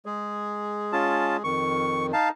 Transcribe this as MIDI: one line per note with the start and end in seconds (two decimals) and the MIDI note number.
0.06 1.43 56
0.06 1.43 68
0.93 1.37 61
0.93 1.37 65
0.93 1.37 81
1.44 2.12 41
1.44 2.12 51
1.44 2.07 85
2.13 2.31 63
2.13 2.29 77
2.13 2.29 81